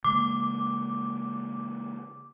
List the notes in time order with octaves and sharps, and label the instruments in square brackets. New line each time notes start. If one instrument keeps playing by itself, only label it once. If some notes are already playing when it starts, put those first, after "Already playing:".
[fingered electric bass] C#3 G#3 A#3 [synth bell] D6